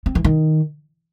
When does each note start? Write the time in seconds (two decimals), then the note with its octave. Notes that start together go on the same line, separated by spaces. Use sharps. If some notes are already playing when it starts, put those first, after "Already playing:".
0.06 C4
0.15 E3
0.24 D#3